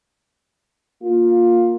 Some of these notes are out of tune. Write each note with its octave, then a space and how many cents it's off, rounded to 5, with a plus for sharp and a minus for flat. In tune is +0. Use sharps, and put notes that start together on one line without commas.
A#3 +0 F4 +15